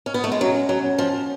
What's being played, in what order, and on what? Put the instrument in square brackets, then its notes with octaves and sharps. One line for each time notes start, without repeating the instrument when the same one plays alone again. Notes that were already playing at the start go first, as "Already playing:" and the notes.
[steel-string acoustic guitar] C#4
B3
A3
G#3
[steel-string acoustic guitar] F#3 [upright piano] C#4
[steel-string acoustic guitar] F#3
[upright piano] C#4
[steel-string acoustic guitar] F3